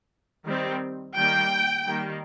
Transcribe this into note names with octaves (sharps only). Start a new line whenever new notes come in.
D#3 G3 C4
D#3 G3 A#3 G5
D#3 G3 A#3